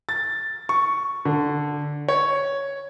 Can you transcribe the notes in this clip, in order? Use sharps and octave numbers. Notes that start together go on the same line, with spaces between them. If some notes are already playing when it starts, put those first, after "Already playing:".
A6
C#6
D3
C#5